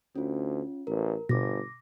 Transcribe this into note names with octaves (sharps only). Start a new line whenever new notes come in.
D2 C#4 F4
A1 A#4
G1 B2 D6 A#6